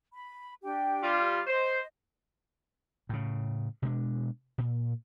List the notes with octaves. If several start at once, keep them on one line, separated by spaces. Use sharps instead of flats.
B5
D4 G4 G5
G3 F4
C5 D#5
A2 C#3
B2 G#3 D4
A#2